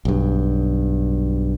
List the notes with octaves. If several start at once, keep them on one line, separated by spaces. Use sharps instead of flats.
B1 G2